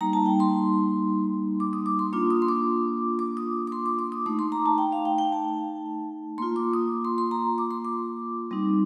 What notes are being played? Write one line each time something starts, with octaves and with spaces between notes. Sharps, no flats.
G3 A#3 D#4 A#5
A5
G5
C6
D6
D#6
D6
C6
A#3 D4 F4 D6
D#6
C6
D6
D6
D#6
D6
C6
D6
D6
D#6
A3 D#4 D6
C6
A#5
A5
G5
F5
G5
G5
A5
A#3 F4 C6
D6
D#6
C6
C6
A#5
D6
C6
D6
G3 C4 D#4